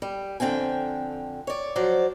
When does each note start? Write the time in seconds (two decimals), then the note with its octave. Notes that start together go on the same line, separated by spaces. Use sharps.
0.02 G3
0.40 F2 D3 C4 G5 G#5
1.47 C#5 D5
1.75 F3 F#3 C5 D5